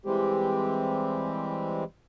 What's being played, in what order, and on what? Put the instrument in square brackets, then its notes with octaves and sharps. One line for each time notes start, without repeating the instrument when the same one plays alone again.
[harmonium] E3 G3 G#3 C4 G4